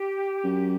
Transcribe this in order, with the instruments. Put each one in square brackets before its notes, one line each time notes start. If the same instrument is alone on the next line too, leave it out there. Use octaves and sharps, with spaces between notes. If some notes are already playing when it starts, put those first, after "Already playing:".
Already playing: [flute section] G4
[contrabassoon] F#2